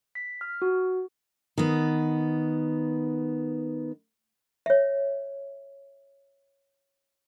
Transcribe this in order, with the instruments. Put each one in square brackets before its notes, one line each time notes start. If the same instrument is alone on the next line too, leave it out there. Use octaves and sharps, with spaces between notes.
[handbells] B6
F6
F#4
[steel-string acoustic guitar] D#3 B3
[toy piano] C#5 E5